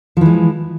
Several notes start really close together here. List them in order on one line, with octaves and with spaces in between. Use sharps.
F3 E3 G#3